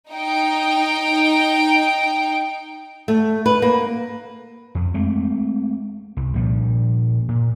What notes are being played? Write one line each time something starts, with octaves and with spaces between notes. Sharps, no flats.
D#4 G5
A3
B4
A#3
F2
G#3 A3 C4
C2
A#2 F3 G3
A#2